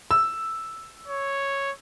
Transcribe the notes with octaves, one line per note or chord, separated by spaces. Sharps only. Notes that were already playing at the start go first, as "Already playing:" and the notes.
E6
C#5